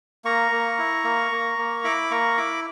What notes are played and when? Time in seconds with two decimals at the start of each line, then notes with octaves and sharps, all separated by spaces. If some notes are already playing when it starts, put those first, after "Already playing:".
0.24 A#3 A#5 C#6
0.51 A#3
0.79 E4
1.04 A#3
1.32 A#3
1.58 A#3
1.84 E4 B5 D6
2.11 A#3 A#5 C#6
2.37 E4 B5 D6